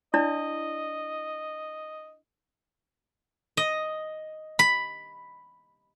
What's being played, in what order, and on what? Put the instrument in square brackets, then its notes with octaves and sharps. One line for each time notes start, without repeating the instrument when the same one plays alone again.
[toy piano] D4 E4 D5 [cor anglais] D#5
[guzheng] D#5
B5